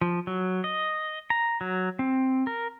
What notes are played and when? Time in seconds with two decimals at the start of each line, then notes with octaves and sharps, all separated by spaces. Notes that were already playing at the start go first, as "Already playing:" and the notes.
0.01 F3
0.27 F#3
0.64 D#5
1.30 A#5
1.61 F#3
1.99 C4
2.47 A#4